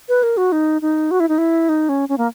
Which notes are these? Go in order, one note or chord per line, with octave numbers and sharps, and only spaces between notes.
B4
A#4
F#4
D#4
D#4
F#4
E4
D#4
E4
D#4
C#4
C#4
A#3